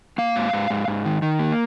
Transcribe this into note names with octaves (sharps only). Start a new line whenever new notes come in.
A#3 F5
G#2
G#2
G#2
G#2
D#3
D#3
A#3